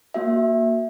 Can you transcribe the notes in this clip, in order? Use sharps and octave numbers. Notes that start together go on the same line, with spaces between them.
A#3 F#4 E5